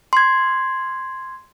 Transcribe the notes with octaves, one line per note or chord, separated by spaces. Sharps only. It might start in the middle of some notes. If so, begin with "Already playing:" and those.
C6 G#6